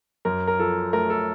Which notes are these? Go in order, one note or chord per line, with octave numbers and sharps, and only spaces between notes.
F#2 A#4
A#4
F3 A4
A3 A#4
A4